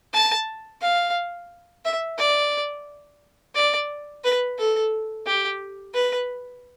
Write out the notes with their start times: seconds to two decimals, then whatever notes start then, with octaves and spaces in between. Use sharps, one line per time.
0.13 A5
0.82 F5
1.85 E5
2.18 D5
3.55 D5
4.24 B4
4.58 A4
5.26 G4
5.94 B4